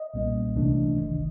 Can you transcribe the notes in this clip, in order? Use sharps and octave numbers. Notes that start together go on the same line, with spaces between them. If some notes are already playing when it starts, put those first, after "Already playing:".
Already playing: D#5
B1 A#2 G3 A#3 C#4
C#2 C3 E3 A3 D4
G1 G2 D#3